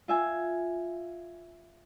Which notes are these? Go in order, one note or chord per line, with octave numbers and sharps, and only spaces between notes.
F4 E5 G#5